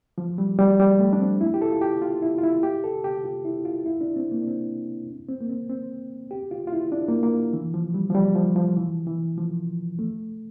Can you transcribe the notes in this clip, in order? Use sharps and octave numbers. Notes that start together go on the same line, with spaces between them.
F3
G3
G3
G3
A3
D4
C4
E4
G4
A4
F4
G4
F4
E4
F4
E4
G4
A4
G4
F4
E4
F4
E4
D4
C4
A#3
D4
C4
C4
A#3
C4
C4
G4
F4
F4
E4
D4
A#3
A#3
E3
F3
G3
F3
G3
F3
F3
E3
E3
F3
A3